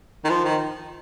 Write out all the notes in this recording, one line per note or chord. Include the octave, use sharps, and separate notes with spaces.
D#3
F3
D#3